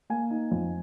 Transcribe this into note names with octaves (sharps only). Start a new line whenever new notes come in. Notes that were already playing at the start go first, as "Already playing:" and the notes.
A#3 G#5
D#4
F2